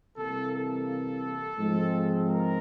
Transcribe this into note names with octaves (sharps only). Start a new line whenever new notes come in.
C3 E3 G3 A#3 A4
A4
G#2 F3 G#3 C4
A#4